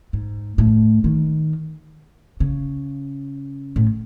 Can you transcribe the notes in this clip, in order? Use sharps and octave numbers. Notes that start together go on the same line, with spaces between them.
G#2
A2
D#3
C#3
A2